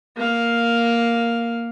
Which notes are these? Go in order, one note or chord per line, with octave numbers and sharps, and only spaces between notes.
A#3 F5